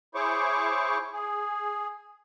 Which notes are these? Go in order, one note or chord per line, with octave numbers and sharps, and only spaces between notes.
E4 G#4 C5 C#5 C#6 D6
G#4